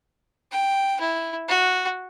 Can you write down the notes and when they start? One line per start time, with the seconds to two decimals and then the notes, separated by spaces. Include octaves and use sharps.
0.52 G5
1.00 E4
1.48 F#4